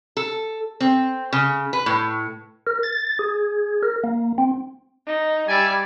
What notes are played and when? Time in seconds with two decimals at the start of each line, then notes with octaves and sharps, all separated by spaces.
0.17 A4
0.81 C4
1.33 C#3
1.73 B4
1.86 A2
2.67 A#4
2.83 A6
3.19 G#4
3.83 A#4
4.04 A#3
4.38 C4
5.07 D#4
5.49 G3 D5 E5 G#5